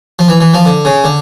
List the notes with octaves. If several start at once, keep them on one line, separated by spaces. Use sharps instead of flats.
F3
E3
E3
F3
D3
C#3
D3